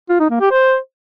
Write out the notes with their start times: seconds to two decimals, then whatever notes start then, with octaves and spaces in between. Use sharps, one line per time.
0.09 F4
0.20 D#4
0.30 A#3
0.41 G4
0.51 C5